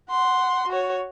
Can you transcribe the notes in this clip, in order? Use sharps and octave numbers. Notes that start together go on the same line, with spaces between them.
F#5 C6
F#4 C#5